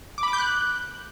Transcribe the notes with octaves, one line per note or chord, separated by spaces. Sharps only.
D6
B5
D6
G6
F#6